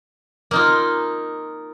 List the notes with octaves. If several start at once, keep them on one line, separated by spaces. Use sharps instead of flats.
A#3 D#4 F4